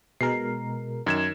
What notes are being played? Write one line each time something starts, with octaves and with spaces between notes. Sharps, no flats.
B2 G#3 A#4 C7
F#2 D#3 G#6 E7